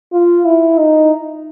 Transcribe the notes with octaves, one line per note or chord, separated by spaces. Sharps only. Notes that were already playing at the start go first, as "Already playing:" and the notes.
F4
E4
D#4